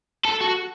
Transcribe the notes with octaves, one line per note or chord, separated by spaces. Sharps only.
A4
F#4